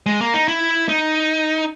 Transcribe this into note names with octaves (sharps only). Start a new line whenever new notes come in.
G#3
A#3
D#4
E4
D#4